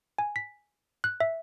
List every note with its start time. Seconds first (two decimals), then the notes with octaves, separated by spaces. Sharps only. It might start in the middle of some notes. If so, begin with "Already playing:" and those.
0.18 G#5
0.36 B6
1.04 F#6
1.20 E5